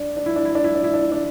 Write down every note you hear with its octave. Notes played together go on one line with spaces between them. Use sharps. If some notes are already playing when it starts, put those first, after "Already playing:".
Already playing: D4
D4
E4
D4
E4
D4
E4
D4
E4
D4
D4